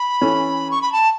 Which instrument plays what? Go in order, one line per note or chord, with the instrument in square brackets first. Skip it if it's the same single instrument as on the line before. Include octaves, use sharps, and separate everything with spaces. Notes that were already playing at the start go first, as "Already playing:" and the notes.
Already playing: [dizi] B5
[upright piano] E3 C#4 A4
[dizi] C#6
B5
A5